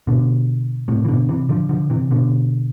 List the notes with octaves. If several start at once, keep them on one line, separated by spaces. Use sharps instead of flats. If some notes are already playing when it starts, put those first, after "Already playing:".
B2 D3
A2 C3
E3
B2 D3
C3 E3
D3 F3
D3 F3
C3 E3
B2 D3